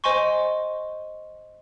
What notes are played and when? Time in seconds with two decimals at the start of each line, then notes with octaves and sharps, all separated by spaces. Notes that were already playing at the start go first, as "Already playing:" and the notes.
0.04 C5 D#5 G#5 C6 C#6